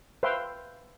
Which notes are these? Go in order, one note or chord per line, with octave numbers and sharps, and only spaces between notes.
B4 C5 E5 F5 G5 C6